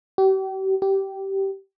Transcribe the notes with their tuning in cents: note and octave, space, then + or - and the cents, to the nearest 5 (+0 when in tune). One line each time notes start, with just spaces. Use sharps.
G4 -40
G4 -15